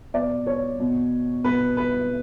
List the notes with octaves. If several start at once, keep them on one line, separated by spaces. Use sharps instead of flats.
B2 D5
C#5
B2
B2 B4
B4